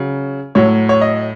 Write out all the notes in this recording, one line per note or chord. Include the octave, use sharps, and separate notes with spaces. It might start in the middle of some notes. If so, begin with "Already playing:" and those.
Already playing: C#3 F#3
A2 F#3 C#5
C#5
D#5